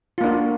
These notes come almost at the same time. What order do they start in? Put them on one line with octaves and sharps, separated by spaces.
F4 A#3 D4 F#4